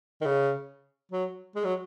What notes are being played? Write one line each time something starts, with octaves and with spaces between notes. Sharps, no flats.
D#3
C#3
F#3
G#3
F#3